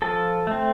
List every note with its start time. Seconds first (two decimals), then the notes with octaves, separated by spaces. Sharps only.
0.02 F3 A4 A5
0.47 A3 C4